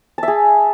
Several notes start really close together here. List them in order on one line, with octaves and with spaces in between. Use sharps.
A5 E5 G#4